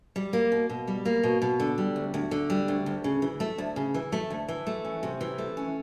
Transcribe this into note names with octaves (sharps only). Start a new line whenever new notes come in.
G3
A#3
B2
B2
G3
A#3
B2
B2
D3
G3
D2
D2
D3
G3
D2
D2
C#3
E3
A3
D2
C#3
E3
A3
D2
E3
A3
C#4
C3
E3
A3
C#4